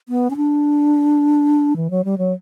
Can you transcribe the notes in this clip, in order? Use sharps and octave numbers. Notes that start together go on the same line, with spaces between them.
B3
C#4
D4
E3
F#3
G3
F#3